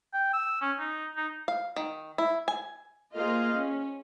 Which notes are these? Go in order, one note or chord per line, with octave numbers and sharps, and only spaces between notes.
G5
E6
C#4
D#4
D#4
F5
D#3
E4
G#5
A#3 F4 G#4 C5 D#5 F5
C#4